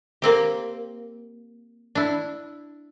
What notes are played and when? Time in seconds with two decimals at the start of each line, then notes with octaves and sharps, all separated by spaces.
0.22 A#3 C4 G4
1.95 D4 E4